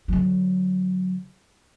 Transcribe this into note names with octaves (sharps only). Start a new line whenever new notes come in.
D3 F#3